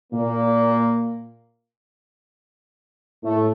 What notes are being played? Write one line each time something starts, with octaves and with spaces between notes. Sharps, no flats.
A#2 A#3
A2 A3